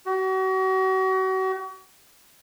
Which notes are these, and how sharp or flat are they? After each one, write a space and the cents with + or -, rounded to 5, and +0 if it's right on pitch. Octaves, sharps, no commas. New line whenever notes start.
F#4 +35